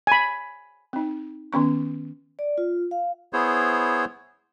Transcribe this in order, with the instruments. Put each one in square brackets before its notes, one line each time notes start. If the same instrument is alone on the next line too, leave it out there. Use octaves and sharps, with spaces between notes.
[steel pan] G#5 B5
[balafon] C4 D#4
D#3 B3 C#4 C#6
[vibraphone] D5
F4
F5
[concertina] B3 E4 G#4 C5 C#5